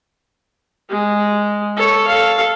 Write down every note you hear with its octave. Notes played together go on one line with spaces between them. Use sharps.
G#3
A4 C#5
A4 F5